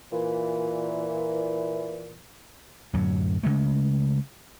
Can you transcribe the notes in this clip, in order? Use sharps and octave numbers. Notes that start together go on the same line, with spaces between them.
A#2 E3
D1 F#2 F#3
C#3 F3 G#3 A3